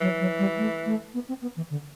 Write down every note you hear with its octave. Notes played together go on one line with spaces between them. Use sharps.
E3 F#3
F#3
G3
A3
A3
B3
C4
B3
E3
D3